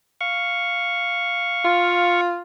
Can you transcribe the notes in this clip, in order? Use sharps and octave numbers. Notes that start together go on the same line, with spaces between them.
F5 C#6
F4